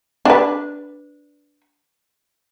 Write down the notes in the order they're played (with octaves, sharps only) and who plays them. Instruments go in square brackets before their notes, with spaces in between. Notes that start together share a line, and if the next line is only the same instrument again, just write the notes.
[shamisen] D4 B4